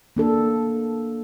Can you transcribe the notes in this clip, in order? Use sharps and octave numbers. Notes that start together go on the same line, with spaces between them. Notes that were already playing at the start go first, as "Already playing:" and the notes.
A#3 D4 A4